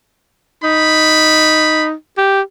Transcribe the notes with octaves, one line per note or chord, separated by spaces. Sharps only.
D#4 B5
G4